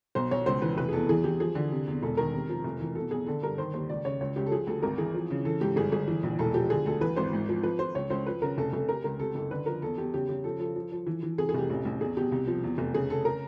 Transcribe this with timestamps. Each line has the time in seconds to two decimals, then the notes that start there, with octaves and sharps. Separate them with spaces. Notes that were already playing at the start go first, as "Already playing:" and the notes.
0.15 B1 C5
0.31 B1 C#5
0.46 C#2 C5
0.62 E3 B4
0.77 F1 B4
0.89 G#4
0.93 E2 A4
1.09 E3 G#4
1.24 E3 G4
1.40 F3 G#4
1.55 D3
1.72 C3
1.87 E2
2.03 E1 A4
2.17 D#3 A#4
2.34 C3
2.49 F3
2.64 F1
2.80 E3
2.95 B2 A4
3.11 B1 G#4
3.27 D3 A4
3.42 G2 A#4
3.58 D#3 C5
3.73 D#2 C5
3.89 C#2 D5
4.05 C#3 C#5
4.21 C#2 C#5
4.36 C#2 G4
4.47 A4
4.52 F3 G#4
4.67 D2 A4
4.82 G#1 A#4
4.98 E3 G#4
5.14 F3
5.30 C#3
5.45 E3 A4
5.61 G#2 G4
5.76 G1 G#4
5.92 G1 G#4
6.08 E3
6.23 A#1
6.39 E1 A4
6.54 F3 G4
6.70 D3 G#4
6.86 D2 A4
7.01 E3 B4
7.16 G#1 C5
7.33 G#2
7.49 F3
7.63 F3 B4
7.79 F3 C5
7.95 C#2 C#5
8.10 C#2 C5
8.26 F3 B4
8.42 C#3 A#4
8.58 F1 A4
8.73 F1 A4
8.89 C3 A#4
9.04 C#2 A#4
9.19 C3 A4
9.35 F#1 A4
9.51 D3 B4
9.66 F3 A#4
9.82 E2 A4
9.98 E2 G4
10.13 C#3 G4
10.29 C#3 G4
10.44 F3 A4
10.60 F3 A4
10.76 F3
10.92 F3
11.07 E3
11.23 E3
11.38 C3 G#4
11.49 G#4
11.54 F1 G4
11.70 A1
11.85 A1
12.00 E2 G#4
12.17 B2 G4
12.32 C2
12.47 F3
12.63 E2
12.78 F1
12.94 C#3 G#4
13.10 C#3 A4
13.25 A#4